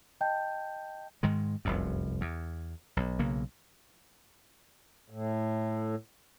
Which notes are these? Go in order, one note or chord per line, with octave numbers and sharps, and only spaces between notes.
D#5 G5 A5 G6
G#2 D#3 G#3
F1 C2 F#2
E2
B1
B1 C#3 A#3
A2